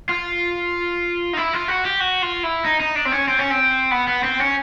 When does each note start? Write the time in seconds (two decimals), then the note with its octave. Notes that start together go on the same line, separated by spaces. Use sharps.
0.09 F4
1.33 D#4
1.37 E4
1.53 F4
1.68 F#4
1.85 G4
2.00 F#4
2.22 F4
2.43 E4
2.65 D#4
2.80 D#4
2.95 D4
3.05 C4
3.12 C#4
3.28 C4
3.39 C#4
3.50 C4
3.91 B3
4.07 B3
4.23 C4
4.40 C#4